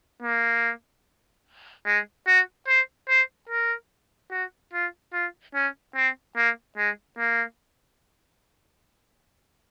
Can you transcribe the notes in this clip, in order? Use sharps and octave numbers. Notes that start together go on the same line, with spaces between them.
A#3
G#3
F#4
C5
C5
A#4
F#4
F4
F4
C#4
C4
A#3
G#3
A#3